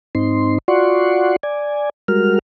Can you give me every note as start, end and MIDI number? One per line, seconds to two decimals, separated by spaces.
0.15 0.58 44
0.15 0.58 60
0.15 0.58 63
0.15 0.58 84
0.68 1.36 65
0.68 1.36 66
0.68 1.36 74
0.68 1.36 78
0.68 1.36 84
0.68 1.36 85
1.43 1.90 74
1.43 1.90 80
2.08 2.39 55
2.08 2.39 56
2.08 2.39 66
2.08 2.39 70
2.08 2.39 89